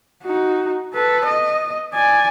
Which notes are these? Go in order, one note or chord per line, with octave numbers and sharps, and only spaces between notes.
D#4 F#4
A4 B4
D#5
D5 G#5